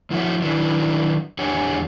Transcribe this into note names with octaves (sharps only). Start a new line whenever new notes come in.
F3 E4 F#4 C#5 E5
D#3 F#3 D4 E4 B4
E2 D4 G4 C#5 F#5 G#5